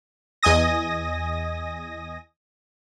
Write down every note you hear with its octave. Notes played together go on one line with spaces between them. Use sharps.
E2 D#5 G#5 D#6 A#6